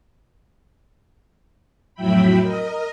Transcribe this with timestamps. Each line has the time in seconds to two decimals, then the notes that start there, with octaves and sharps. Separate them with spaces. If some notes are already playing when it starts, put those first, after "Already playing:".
1.95 F2 A2 F#3 E5 G5 B5
2.41 A#4 D#5